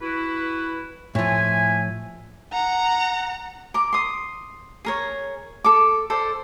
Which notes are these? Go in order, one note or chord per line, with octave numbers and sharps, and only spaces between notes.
E4 F#4 B4
A2 F3 E5 G#5
F#5 A#5
A#4 D6
C6 D#6
G#4 A#4 C#5
A4 D6
A4 C5 D5